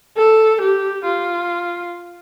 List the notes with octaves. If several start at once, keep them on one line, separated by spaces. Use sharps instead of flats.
A4
G4
F4